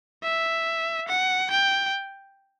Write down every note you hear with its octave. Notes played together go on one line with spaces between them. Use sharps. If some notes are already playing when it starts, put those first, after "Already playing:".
E5
F#5
G5